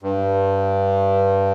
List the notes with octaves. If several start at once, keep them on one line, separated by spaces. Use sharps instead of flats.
G2